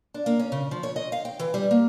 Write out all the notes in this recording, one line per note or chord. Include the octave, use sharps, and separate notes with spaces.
D4
A#3
C#4
C#3
F3
C#5
D#5
F5
G5
E3
G3
A#3